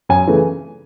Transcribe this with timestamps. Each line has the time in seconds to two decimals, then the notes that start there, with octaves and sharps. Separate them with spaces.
0.09 F#2 G#5
0.27 C#3 E3 A3